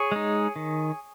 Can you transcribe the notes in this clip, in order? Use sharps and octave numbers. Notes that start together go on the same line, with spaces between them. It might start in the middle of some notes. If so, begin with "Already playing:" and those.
Already playing: G#4 C#5
G#3 D#4
D#3